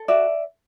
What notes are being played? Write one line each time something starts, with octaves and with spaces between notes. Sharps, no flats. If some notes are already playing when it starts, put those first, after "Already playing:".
Already playing: A4
F#4 D5 E5